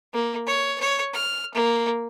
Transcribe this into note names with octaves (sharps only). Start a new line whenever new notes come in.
A#3
C#5
C#5
F6
A#3